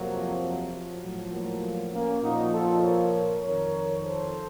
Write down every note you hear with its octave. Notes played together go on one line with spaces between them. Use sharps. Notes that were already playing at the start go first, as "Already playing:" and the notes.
Already playing: F2 C3 F3 F#3 A#3
F#3
F3
A2 F3 F#3
F#3 A#3
A#3 C#4
A#2 F3 D#4 F#4
F4 A4
A#4 C#5
F2 D#3 A#4 C#5
A4 C5